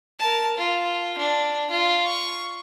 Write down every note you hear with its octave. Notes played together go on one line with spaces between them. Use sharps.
A#4 A5
F4
D4
F4
C#6